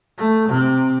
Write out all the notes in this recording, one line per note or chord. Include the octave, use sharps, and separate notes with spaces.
A3
C3